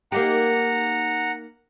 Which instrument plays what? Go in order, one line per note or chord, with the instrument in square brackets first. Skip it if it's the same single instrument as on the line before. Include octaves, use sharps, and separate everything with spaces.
[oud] A#3 D#4 G4 [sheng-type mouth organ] F#5 A#5